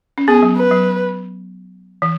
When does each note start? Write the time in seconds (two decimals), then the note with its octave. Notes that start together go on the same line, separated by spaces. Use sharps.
0.18 C#4
0.28 B3 G#4
0.43 F#3
0.56 B4
0.71 F#3
2.02 E3